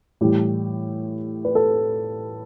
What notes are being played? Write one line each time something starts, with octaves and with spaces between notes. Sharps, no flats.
A2 E3 G3 G4
B4
A4